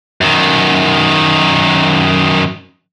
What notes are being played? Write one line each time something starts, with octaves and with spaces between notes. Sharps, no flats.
F#2 D#3